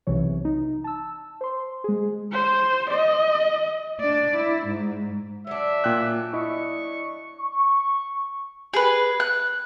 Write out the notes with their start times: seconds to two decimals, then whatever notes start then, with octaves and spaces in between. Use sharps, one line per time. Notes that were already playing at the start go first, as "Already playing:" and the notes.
0.07 B1 C3 E3 C#5
0.45 D#4
0.84 A5 E6
1.41 C5 C6
1.84 G#3 G#4
2.32 C5
2.90 D#5
4.01 D4 D5
4.36 E4
4.67 G#2
5.47 F#3 A3 D4 E5
5.84 A#2 G5 F#6
6.33 E4 D#5 C#6
7.40 C#6
8.74 G#4 B4
9.20 F#6